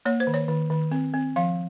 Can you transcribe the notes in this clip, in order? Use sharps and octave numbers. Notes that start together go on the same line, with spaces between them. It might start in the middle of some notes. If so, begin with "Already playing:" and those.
A#3 C#5
C5
D#3
C#5
D#3
D#3
C4
C4
F3 F5